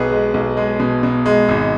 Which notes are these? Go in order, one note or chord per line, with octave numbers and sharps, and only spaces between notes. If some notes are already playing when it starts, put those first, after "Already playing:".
Already playing: B1 B3 G#4 B4
G#3
B1
G#3
B2
B2
G#3
G#1